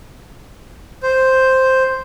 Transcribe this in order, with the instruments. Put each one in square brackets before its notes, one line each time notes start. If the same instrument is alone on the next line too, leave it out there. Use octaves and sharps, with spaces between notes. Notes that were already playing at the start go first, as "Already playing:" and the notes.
[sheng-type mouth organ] C5